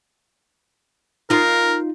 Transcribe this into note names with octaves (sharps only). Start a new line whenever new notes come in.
D#4 F4 A#4